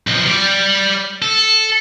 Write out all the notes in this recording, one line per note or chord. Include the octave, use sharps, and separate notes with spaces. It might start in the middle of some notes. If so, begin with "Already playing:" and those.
B1 F3
G3 D5
A4